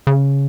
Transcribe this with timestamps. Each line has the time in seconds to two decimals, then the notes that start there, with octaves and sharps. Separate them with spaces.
0.07 C#3